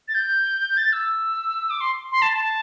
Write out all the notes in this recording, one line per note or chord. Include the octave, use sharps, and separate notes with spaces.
A6
G6
A6
E6
D6
C6
C6
A5
A5